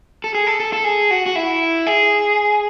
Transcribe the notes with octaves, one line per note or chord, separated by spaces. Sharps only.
A4
G#4
A4
A4
A4
G#4
F#4
F#4
E4
G#4